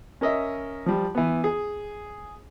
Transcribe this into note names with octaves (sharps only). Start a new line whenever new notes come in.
C#4 A#4 D#5 E5
F3 G3
E3 B3
G#4